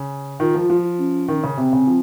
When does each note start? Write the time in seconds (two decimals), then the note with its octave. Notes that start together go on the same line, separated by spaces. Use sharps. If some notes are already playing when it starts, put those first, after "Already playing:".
Already playing: C#3
0.40 D#3 F4
0.55 F3
0.70 F3
0.99 C#4
1.28 D#3
1.43 C#3
1.57 C3 C4
1.73 C#3
1.87 F3